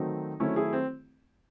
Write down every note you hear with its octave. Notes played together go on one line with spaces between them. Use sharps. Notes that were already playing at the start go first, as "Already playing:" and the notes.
Already playing: D#3 F#3 A3 C4 D#4
D#3 F#3 A3 C4 C#4 E4
E4 G#4
C4